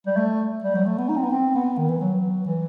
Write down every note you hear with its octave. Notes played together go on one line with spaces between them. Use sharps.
G3
A3
G3
F#3
A3
B3
D#4
C4
B3
C4
B3
D#3
E3
F#3
E3